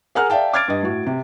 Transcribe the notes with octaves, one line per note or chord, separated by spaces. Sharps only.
G#4 A#4 F#5 A#5 F6
D5 E5 F5 G5 A5
D6 F6 G#6 A6 D7
G2 D#5
A2 F#4
C3